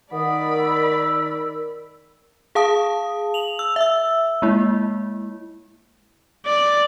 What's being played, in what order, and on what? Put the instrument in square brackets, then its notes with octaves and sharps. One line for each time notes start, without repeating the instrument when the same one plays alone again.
[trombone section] D#3 [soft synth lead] A#4 [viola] D5 B5 [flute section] F#5 D#6
[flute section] E6
[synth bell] G#4 F5 A5 D#6
F7 F#7
E6
E5 E6
G#3 A#3 E4
[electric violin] D5